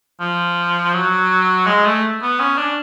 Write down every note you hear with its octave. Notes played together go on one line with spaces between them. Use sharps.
F3
F#3
G#3
A3
B3
C#4
D4